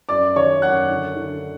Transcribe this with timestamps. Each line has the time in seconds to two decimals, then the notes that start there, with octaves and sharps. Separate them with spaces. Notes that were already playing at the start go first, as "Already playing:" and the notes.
0.09 F#2 D5 D6
0.36 D#3 C#5 C#6
0.62 F#2 F#5 F#6
0.90 D3
1.16 D3